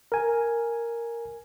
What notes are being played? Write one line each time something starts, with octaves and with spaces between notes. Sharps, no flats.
A#4 G#5